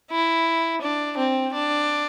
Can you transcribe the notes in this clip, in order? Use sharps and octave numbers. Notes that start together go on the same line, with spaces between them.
E4
D4
C4
D4